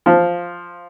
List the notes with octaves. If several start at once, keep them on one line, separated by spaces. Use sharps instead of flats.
F3